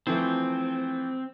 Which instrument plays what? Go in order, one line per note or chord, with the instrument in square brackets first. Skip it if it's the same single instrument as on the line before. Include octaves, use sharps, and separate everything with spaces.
[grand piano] E3 F3 A3 [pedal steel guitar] C4